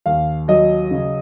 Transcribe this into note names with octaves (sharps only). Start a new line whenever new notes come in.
D#2 F5
F#3 D#5
C#3